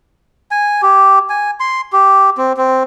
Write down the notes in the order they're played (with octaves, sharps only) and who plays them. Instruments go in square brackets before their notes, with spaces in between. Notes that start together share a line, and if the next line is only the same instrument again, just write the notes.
[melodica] G#5
G4
G#5
C6
G4
C4
C4